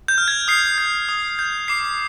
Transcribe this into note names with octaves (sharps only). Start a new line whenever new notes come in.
G6
F6
G#6
D#6 C7
G6
D#6
G6
D6 C7